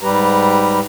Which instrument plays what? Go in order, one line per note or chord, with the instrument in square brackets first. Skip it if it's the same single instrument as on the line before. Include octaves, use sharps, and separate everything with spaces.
[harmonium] G#2 G3 G4 B4 A#5